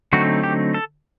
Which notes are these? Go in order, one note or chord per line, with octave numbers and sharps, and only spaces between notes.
D3 F#3 A3 C4 D#4 F#4
G4
A4